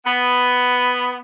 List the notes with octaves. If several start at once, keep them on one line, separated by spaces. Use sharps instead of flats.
B3